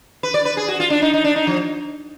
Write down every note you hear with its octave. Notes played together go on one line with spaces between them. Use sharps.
B4
D5
B4
G#4
F#4
F4
D4
D#4
D#4
D4
D#4
F3